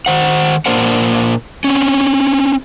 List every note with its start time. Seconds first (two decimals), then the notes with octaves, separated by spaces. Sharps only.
0.06 D#3 C5 F#5
0.66 A#2 A#3 D4 A#4 C5 F#5
1.64 C4 C#4